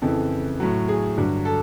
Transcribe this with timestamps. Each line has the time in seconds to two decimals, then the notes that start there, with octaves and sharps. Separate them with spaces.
0.02 F2 C#3 E3 A4
0.60 A2 F#3
0.88 G#4
1.17 G2 D3 F#3
1.45 A4